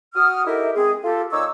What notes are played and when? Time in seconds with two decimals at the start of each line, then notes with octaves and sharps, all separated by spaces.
0.15 F#4 D#6 F6
0.47 D#4 E4 G4 A4 A#4 E5
0.76 G#3 C4 G#4
1.04 F4 G4 A4
1.32 A#2 D#4 C#5 C#6 D6 E6